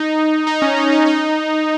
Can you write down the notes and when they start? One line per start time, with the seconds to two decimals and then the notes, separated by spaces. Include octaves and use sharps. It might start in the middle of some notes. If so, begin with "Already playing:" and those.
Already playing: D#4
0.47 D#4
0.62 C#4
0.77 D#4
0.92 D#4
1.07 D#4